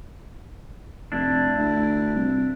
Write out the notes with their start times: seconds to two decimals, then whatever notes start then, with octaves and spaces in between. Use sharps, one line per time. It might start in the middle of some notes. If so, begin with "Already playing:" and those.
1.12 F1 D4 E4
1.59 D2
2.15 C2